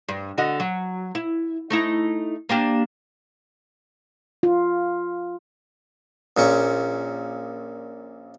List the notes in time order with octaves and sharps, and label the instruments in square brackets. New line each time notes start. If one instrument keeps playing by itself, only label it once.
[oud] G2
D3 F#4 D#5
F#3
E4
A3 D#4 E4
A#3 D4 G4
[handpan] F4
[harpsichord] A#1 A#2 C#4 C#6